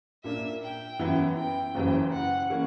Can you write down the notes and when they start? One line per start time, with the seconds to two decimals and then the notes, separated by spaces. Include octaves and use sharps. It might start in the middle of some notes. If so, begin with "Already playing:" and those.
0.24 A#2 A#3 D4 E5
0.62 G5
0.99 F#2 E3 B3 E4
1.37 G5
1.75 F#1 F#2 E3
2.13 F#5
2.50 E3 A#3 C#4